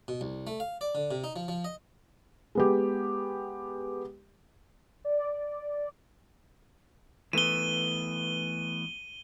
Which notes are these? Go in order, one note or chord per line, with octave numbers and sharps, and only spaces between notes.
B2
C2
A3
F5
D5
D3
C3
D#4
F3
F3
D#5
G#3 B3 G4
D5
E3 A3 B3 D#7 G7